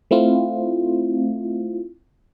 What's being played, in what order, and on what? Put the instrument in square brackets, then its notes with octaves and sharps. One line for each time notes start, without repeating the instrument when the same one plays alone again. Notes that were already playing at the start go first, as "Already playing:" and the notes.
[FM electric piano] A3 C4 E4 F4